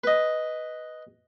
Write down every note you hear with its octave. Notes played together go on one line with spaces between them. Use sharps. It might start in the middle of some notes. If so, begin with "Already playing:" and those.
B4 D#5